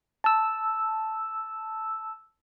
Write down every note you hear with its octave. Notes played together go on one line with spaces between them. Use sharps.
A5 E6